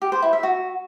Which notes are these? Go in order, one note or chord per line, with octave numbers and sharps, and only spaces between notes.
G4
C5
E4
E5
F#4